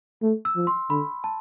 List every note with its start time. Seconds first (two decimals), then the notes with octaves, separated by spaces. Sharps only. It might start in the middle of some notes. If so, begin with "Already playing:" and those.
0.22 A3
0.45 E6
0.56 F3
0.67 C6
0.90 D3 B5
1.24 A5